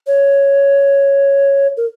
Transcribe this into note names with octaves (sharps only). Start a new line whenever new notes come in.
C#5
A#4